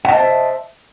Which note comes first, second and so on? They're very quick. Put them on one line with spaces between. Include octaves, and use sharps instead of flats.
F#5 D#5 A5 C5 E5